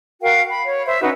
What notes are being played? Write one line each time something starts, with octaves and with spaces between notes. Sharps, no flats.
F#4 A#4 F5 G5
B5
C#5
C5 E5
C#4 D#4 F#4 B4